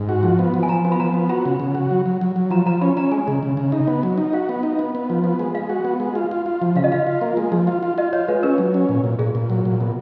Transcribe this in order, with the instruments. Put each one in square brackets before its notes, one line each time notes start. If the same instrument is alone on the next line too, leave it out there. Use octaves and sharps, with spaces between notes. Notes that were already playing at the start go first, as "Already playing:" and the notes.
Already playing: [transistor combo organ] G#2
F#4
F3
B3
F3
[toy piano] G#5
[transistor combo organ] F3 [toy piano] A#5
[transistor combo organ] B3
[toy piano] B5
[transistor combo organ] F3 [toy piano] A#5
[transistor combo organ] B3
[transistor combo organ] F#4 [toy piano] B5
[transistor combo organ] C#3
C#3
F#4
F#3
F#3
F#3
F#3
[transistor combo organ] F3 [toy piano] A#5
[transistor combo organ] F3 [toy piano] A#5
[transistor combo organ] C#4 [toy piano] B5
[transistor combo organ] C#4 [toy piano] A#5
[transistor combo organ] G#3 [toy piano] G#5
[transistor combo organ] C#3
C#3
C#3
D#4
B3
F#3
D#4
[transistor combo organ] F#4 [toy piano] F5
[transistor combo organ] B3
D#4
B3
B3
F3
B3
G#3
[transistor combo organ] G#3 [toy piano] F5
[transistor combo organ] F#4
B3
G#3
F4
F4
F4
F3
[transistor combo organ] C#3 [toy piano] F5
[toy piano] D#5
[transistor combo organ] F4 [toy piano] F5
[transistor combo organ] F4
A#3
G#3
F3
F4
F4
[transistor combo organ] F4 [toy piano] D#5
[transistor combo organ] F4 [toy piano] C#5
[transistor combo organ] G#3 [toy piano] B4
[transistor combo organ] C#4 [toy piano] A#4
[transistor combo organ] F#3
C#4
A#2
A#2
[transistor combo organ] A#2 [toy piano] G#4
[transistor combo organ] A#2
F#3
A#2
B2